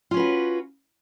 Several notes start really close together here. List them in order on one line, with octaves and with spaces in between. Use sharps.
F4 C#4 B4 F#4